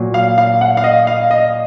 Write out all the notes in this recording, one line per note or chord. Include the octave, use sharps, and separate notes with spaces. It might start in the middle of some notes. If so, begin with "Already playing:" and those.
Already playing: A#2 F#3
F5
F5
F#5
F5
D#5
F5
D#5